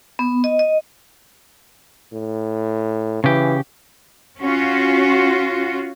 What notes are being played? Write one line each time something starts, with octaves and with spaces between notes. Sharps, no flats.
B3
D#5
D#5
A2
C#3 E3 G4
C#4 F4 F#4